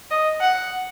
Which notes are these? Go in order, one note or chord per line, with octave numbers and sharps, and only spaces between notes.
D#5
F#5